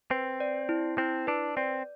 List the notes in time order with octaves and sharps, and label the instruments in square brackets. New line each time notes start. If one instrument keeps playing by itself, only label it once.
[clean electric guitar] C4 [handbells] B4
[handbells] D5
E4
[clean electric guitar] C4 [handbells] E4
[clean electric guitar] D4 [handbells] B4
[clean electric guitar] C4 [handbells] D5